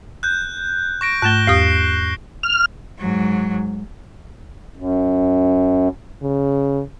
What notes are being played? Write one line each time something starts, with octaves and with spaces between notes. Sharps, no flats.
F#6 G6
C#6 A#6 D7
G#2 A3 F#6 E7 G7
E2 G4 D#6 C7
F6
G#2 F#3
F#2
C#3